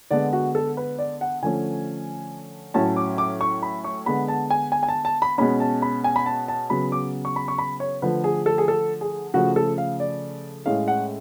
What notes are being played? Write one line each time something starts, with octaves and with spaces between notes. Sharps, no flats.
D3 G#3 B3 D5
F#4
A4
B4
D5
F#5
D3 F3 A3 C#4 G#5
A2 F#3 C#4 A5
D6
D6
C#6
B5
C#6
D3 G#3 B3 B5
A5
G#5
G#5
G#5
A5
A5
B5
B2 G#3 C#4 B5
A5
B5
G#5
B5
A5
A5
C#3 F#3 B3 B5
D6
C#6
B5
C#6
B5
C#5
D3 F3 A3 B4
G#4
A4
G#4
A4
G#4
C#3 F3 A3 F#4
A4
F5
D5
A2 G#3 C#4 F5
F#5